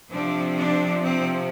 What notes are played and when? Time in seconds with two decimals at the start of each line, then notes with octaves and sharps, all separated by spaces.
0.10 C3 F3 C4 D4
0.57 D4
1.02 C4